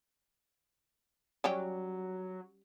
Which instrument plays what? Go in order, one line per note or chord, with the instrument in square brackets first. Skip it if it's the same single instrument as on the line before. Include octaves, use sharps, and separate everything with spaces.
[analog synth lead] F#3 [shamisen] G3 C#4 G4